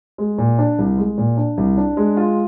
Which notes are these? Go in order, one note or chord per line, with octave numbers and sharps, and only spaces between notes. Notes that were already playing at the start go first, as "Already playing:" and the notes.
G#3
A#2
D4
C2
G#3
A#2
D4
C2
D4
G#3
F4